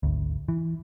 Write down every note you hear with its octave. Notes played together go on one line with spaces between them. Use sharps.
G#1 D2
E3